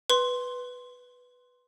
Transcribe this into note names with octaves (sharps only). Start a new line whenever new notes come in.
B4 C6